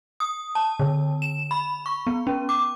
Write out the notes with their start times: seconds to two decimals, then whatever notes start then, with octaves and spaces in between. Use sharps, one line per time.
0.20 D#6
0.55 A5
0.80 D3
1.22 E7
1.51 B5
1.86 C#6
2.07 B3
2.27 C#4
2.49 D6